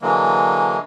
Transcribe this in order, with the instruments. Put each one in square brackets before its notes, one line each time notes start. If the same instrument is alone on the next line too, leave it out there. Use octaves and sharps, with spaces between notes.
[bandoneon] D3 E3 F#3 G#3 A#3